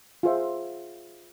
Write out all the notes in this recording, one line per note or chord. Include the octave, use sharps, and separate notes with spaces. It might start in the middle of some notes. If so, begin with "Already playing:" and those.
F4 G#4 C5 E5